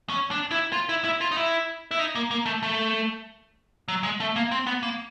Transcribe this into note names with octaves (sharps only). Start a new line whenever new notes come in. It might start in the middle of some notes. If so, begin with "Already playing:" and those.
C#4
D4
E4
F4
E4
E4
F4
D#4
E4
E4
D#4
A#3
A#3
A3
A3
F#3
G#3
A3
A#3
C4
B3
A#3